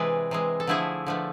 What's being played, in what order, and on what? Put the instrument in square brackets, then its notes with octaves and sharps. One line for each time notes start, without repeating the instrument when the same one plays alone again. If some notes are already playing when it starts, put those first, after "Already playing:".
Already playing: [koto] C3 E3 G#3 B4 D5
C3 E3 G#3
A4
D3 F3 A3 E4 G#4
D3 F3 A3